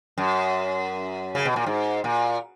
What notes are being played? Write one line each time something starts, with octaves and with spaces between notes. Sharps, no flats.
F#2
C#3
B2
A#2
G#2
A#2